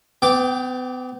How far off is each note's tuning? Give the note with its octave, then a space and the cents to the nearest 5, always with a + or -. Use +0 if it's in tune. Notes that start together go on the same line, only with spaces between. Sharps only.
B3 +40 G5 +0 D6 -5